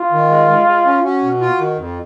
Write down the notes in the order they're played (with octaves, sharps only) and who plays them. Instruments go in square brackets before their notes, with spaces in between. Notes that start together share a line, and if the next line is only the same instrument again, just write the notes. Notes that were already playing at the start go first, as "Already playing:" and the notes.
Already playing: [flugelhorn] F4
[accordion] D#3
G#3
G#3
G#3
C#4
[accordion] C#4 [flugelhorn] F#4
[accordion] B2
F4
D#3
F2